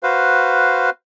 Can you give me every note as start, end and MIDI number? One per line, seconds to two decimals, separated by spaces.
0.03 0.90 66
0.03 0.90 71
0.03 0.90 72
0.03 0.90 77